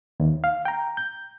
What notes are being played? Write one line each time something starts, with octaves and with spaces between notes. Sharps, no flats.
D#2
F5
G5 A#5
G6